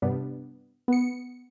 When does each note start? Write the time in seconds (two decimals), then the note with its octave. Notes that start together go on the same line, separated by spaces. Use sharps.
0.02 G2 C3 G3 B3 D4
0.88 B3 C#7